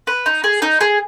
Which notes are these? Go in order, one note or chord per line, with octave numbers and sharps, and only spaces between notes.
B4
D#4
G#4
D#4
G#4